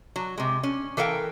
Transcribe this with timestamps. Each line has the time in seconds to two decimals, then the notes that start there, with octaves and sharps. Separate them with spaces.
0.16 F#3
0.38 C3 G#3
0.63 C#4
0.97 E3 A4 A#4 F5 G5